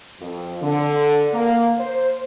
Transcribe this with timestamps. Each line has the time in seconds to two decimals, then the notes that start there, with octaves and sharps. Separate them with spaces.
0.20 F2
0.62 D3
1.34 A#3
1.79 C5